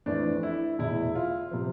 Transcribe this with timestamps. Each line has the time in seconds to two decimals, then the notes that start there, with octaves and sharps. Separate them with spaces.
0.06 F2 E3 A3 D4
0.43 E4
0.79 F1 E2 B2 E4
1.15 F4
1.51 C3 F3